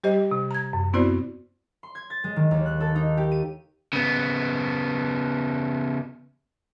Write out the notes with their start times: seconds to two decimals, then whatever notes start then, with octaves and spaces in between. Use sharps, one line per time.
0.04 G3 G4 C5 D#5
0.31 C3
0.51 A#5 G#6
0.73 F#2
0.93 B3 C4 E4 F#4 C5 D5
1.83 C6
1.95 G#6
2.10 A6
2.24 G#3
2.36 D#3
2.51 D#2
2.66 F#6
2.80 A4
2.95 D#4
3.17 G4
3.31 D#7
3.93 C#3 B3